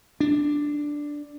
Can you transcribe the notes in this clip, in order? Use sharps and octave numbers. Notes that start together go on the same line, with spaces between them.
D4